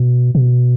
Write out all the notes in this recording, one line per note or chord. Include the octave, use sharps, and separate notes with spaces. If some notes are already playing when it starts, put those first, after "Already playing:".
Already playing: B2
B2